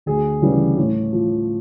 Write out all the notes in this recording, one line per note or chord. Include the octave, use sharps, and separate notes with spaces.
D2 G#4
C#3 E3 G3
A2
F3